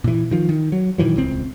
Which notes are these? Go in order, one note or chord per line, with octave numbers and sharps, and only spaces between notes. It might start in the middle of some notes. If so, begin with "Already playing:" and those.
A#2 E3
D#3 F3
D#3
F#3
A#2 D#3 E3 F#3
D#1 C#2 C4